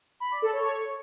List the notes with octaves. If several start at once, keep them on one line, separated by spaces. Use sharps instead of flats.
B5
D5
A4
C#5